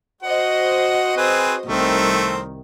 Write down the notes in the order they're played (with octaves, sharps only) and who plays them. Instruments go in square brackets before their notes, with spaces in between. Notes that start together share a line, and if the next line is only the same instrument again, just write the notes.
[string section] F#4 C5 D#5 [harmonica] F#5
[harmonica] C4 G#4 B4
[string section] C2 D#3 [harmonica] A3 C4